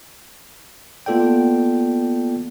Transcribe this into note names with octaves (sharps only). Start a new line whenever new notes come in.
A#3 B3 F4 A4 D5 G5